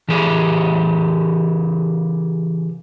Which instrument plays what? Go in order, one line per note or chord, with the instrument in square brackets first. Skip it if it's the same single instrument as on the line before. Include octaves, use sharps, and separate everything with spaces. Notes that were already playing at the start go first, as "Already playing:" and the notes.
[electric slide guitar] C#3 E3 G4 G#4